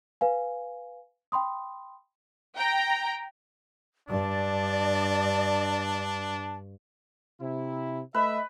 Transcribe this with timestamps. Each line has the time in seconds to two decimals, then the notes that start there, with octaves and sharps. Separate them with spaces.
0.21 B4 F5 G#5
1.32 G5 B5 C6 D#6
2.55 G5 A#5
4.09 G2 D4 D5 A5
7.40 C3 E4
8.14 A3 B4 D#5 E5